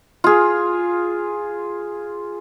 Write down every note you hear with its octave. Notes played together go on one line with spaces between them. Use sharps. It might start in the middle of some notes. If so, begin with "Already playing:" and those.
F4 G#4